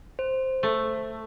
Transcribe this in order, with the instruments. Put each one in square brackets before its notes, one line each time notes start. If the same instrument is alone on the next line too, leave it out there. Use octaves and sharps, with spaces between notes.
[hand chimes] C5
[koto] A3